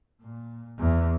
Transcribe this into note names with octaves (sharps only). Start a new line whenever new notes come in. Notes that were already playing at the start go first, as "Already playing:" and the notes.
A#2
E2